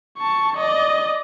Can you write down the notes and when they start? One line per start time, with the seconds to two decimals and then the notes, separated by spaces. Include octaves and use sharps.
0.18 A5 C#6
0.57 D5 D#5